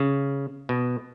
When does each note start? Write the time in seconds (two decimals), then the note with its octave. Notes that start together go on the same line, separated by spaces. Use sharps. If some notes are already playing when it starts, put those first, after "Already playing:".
Already playing: C#3
0.69 B2